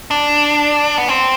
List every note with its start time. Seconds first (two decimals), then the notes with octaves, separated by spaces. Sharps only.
0.11 D4
0.98 B3
1.08 C4